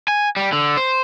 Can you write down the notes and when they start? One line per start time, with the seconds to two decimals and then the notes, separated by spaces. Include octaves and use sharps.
0.08 G#5
0.36 G3
0.53 D3
0.77 C5